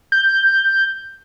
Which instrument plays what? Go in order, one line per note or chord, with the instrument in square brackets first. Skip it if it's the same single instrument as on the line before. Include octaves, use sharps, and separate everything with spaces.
[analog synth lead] G6